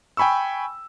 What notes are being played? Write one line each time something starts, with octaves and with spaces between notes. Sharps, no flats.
G5 G#5 B5 C#6 E6